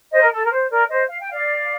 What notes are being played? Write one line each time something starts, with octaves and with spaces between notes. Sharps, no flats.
C5 D#5
A#4
A4
A#4
C5
A#4 D5
C5 D#5
F5
G5
D5 F5